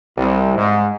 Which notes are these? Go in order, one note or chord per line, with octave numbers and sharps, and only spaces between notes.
C2
G#2